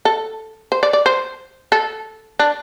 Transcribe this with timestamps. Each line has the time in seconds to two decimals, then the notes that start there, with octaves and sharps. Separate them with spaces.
0.05 A4
0.72 C5
0.83 D5
0.93 D5
1.06 C5
1.72 A4
2.39 D4